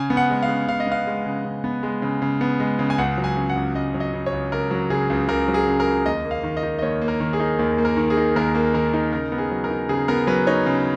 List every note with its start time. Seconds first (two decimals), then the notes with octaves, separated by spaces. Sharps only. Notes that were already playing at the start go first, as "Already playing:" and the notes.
Already playing: C#3 G#5
0.10 B3
0.17 F#5
0.30 G#3
0.43 F5
0.48 C#3
0.68 C#3 F5
0.80 D#5
0.87 B3 F5
1.07 G#3
1.26 C#3
1.45 C#3
1.64 B3
1.83 G#3
2.02 C#3
2.22 C#3
2.41 B3
2.60 G#3
2.79 C#3
2.90 G#5
2.98 C#2 F#5
3.18 F#3
3.24 G#5
3.37 C#3
3.49 F#5
3.56 C#2
3.75 C#2 D#5
3.94 F#3
4.00 D#5
4.14 C#3
4.26 C#5
4.33 C#2
4.52 C#2 A#4
4.71 F#3
4.90 C#3 G#4
5.10 C#2
5.28 C#2 A#4
5.48 F#3
5.54 G#4
5.67 C#3
5.80 A#4
5.86 C#2
6.06 D#2 D#5
6.25 A#3
6.31 F5
6.44 D#3
6.57 D#5
6.63 D#4
6.79 D#5
6.82 D#2 C#5
7.01 A#3
7.08 A#4
7.20 D#3
7.33 G#4
7.40 D#4
7.59 D#2
7.78 A#3
7.85 A#4
7.97 D#3
8.10 G#4
8.17 D#4
8.36 D#2 A#4
8.55 A#3
8.74 D#3 A#4
8.93 D#4
9.12 C#3 A#4
9.32 B3
9.38 G#4
9.51 F#3
9.64 A#4
9.70 D#4
9.89 C#3 G#4
10.08 B3 A#4
10.27 F#3 B4
10.47 D#4 C#5
10.66 C#3